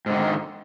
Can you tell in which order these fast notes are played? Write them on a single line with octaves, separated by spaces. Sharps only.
G#2 D3 D#3